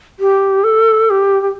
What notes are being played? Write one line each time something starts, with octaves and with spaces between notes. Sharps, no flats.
G4
A4
G4
G4